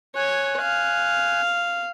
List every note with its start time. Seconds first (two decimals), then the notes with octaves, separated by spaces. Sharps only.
0.16 C#5 G#5 F#6
0.62 F5